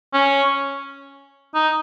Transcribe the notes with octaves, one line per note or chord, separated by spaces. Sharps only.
C#4
D#4